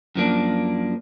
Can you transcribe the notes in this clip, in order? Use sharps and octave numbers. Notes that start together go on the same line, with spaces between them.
F#2 F3 A#3 D4